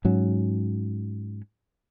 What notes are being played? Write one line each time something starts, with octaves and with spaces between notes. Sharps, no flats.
G#2 F#3 C#4